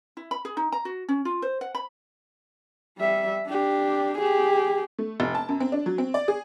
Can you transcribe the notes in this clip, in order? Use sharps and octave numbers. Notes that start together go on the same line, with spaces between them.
E4
B5
G#4
D#4
A#5
F#4
C#4
F4
C5
F#5
B5
G3 E5
D4 G4
G4 G#4
A3
F1
A5
F#2
C4
D4
F#3
C4
D5
G#4